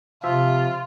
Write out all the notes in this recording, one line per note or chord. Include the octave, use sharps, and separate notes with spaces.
C3 F3 F4 E5